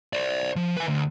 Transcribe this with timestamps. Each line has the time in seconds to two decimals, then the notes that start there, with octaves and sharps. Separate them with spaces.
0.13 C5 D5
0.56 F3
0.77 B4 G#5
0.88 D2